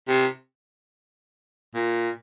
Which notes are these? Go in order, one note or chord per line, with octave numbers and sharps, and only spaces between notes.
C3
A#2